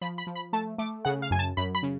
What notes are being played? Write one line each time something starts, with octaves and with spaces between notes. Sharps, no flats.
F3 B5
B5
F3
B5
A3 A5
A3 D6
C#3 F#5
F5
F#2 G#5
A5
F#2 B5
B5
C#3